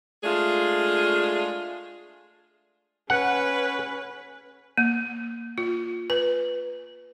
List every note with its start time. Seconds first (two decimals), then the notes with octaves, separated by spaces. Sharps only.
0.24 G#3 A3 D4 F4 G#4
3.10 C#4 B4 F#5
4.77 A#3
5.58 F4
6.10 B4